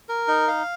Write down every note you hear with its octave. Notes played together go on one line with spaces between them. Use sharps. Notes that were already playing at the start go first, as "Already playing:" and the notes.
A#4
D#4
F5